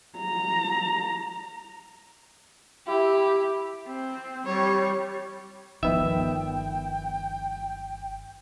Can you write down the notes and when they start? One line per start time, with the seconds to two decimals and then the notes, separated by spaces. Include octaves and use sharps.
0.19 A#5
2.87 E4 G4
3.87 C4
4.46 G3 C#5
5.83 G1 D#3 F3 B3 E5 G5